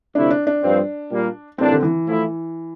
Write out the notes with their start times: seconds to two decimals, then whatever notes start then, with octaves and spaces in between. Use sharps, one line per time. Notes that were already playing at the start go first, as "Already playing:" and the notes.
0.15 D2 C3 F3 A3 D4 E4
0.31 D4
0.47 D4
0.63 G2 F3 C4
1.11 A#2 G3 A#3
1.58 A2 E3 G3 A#3 C4 D4
1.72 D3
1.83 E3
2.07 A2 F3 A3 E4